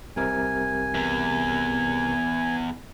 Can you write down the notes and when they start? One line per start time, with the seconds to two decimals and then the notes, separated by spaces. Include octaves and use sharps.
0.16 C2 C3 A#4 G#5
0.94 E2